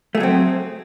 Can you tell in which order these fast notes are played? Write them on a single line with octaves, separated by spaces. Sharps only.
A3 G#4 F#3 C4